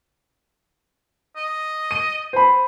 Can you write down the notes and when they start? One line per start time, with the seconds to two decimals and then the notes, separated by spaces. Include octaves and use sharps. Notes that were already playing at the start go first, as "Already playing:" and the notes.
1.36 D#5
1.91 D#7
2.33 C5 B5